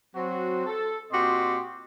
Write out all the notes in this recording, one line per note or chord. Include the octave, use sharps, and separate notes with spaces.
F#3 C4 F#4
A4
A#2 C4 F#4 G4 D#5 C6